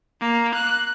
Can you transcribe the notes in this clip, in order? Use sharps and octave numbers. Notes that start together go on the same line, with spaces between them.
A#3
F#6